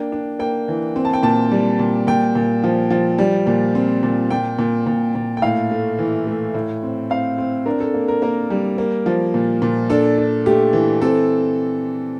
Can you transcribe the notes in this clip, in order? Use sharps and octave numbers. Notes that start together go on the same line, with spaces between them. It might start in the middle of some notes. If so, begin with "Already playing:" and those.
Already playing: A#3 D4 G5
D4
A#3 G5
E3
C4
A5
G5
A#2 A5
G3
A#2
A#2 G5
A#2
F3
F3
G3
A#2
C4
A#2
A#2 G5
A#2
A#2
A#2
G5
A2 F5
A3
E3
A3
A2
C4
C4 F5
C4
D4 A#4
A4
A#3
A#4
A#3 A#4
G3
A#3
F3
A#2
A#2
D4 A4
D4
A3 G4
E3
C4 A4